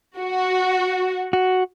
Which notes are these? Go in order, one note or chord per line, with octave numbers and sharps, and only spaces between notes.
F#4
F#4